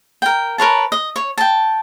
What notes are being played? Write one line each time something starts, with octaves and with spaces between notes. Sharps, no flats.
A#4 G5
A#4 B4 C#5 A5
D#5
C#5
G5 A5